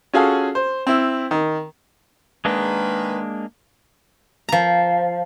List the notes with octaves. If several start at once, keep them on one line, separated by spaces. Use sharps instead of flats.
C#4 F4 F#4 G#4 A4 F5
C5
C4 E4
D#3
D#3 G#3 A#3 D4 G#4 B4
F3 A#5